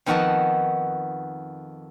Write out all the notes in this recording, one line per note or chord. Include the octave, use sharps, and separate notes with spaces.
F2 D#3 B3 F#4 D#5 A5